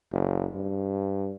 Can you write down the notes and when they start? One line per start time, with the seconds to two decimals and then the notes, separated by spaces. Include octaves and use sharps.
0.12 F#1
0.54 G2